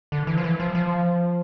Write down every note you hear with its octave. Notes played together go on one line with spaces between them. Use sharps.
D3
E3
F3
E3
F3
F3